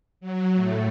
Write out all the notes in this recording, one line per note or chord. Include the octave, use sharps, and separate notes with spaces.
F#3
A2 A3